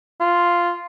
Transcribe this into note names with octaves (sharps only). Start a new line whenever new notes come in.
F4